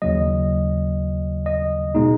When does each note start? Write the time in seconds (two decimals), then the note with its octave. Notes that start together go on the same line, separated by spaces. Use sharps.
0.02 D#2 C#3 F#3 D#5
1.46 D#5
1.95 B2 G#3 D#4